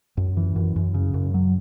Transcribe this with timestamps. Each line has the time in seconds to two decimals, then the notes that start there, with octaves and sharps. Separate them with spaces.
0.17 F#2
0.37 E3
0.56 F#2
0.76 F#2
0.94 C#3
1.14 F#2
1.34 F#3